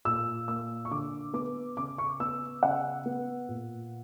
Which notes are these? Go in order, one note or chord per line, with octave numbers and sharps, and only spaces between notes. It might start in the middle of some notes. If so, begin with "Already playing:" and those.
A#2 E6
A#3 E6
C#6
D3 D6
B3 D6
C#3 D6
C#6
B3 E6
C#3 F#5
B3
A#2